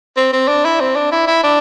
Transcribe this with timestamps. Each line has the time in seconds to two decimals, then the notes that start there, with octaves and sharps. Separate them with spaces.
0.17 C4
0.33 C4
0.48 D4
0.65 E4
0.80 C4
0.96 D4
1.12 E4
1.27 E4
1.44 D4